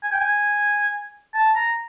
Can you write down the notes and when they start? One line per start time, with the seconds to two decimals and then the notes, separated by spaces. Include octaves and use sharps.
0.04 G#5
0.12 G5
0.20 G#5
1.34 A5
1.56 A#5